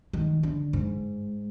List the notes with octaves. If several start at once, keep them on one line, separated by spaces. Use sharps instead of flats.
D#3
D3
G#2